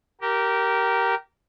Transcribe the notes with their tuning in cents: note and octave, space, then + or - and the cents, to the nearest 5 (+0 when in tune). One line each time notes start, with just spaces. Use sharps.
G4 -20 A#4 +0